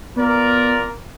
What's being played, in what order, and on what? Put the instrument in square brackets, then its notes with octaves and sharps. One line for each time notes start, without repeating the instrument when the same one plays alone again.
[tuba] B3 [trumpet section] F4 A#4 D5